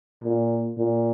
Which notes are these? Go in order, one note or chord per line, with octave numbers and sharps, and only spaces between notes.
A#2
A#2